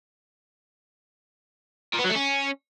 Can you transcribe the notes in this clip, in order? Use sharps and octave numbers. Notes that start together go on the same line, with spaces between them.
A#2
B3
F#3
A3
C#4